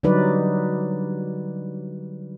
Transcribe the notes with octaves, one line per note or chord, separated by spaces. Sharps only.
D3 F#3 G3 D#4 B4 D5